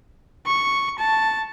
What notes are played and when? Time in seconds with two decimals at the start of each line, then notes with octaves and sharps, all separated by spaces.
0.47 C#6
0.99 A5